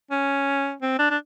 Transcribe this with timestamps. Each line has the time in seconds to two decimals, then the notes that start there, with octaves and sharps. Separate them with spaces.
0.11 C#4
0.82 C4
0.99 D4
1.10 D4